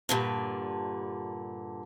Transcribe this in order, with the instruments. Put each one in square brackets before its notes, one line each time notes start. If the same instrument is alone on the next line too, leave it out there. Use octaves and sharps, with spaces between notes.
[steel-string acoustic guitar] G2 A#2 D3